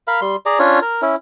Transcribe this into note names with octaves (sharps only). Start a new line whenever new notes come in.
A#4 F5 B5
G3 C6
G#4 D5 A#5
C#4 D4 F4 C#5
A#4
C#4 E4